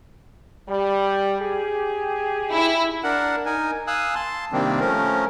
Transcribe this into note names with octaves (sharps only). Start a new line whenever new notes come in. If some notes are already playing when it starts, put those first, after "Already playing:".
G3
G4 G#4
E4
D4 A#4 F#5
D#4 A#4 G#5
F5 G#5 D#6 E6 F#6
A5 C6
C3 D#3 G3 A#3 C4 D4
F3 A3 C#4 A#4